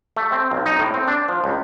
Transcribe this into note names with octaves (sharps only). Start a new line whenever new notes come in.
A3
C4
B1
D#4
A2
C4
D4
F3
C#2